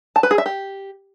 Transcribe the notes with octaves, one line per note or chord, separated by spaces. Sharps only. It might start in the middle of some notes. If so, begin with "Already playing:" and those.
A5
B4
G#4
E5
G4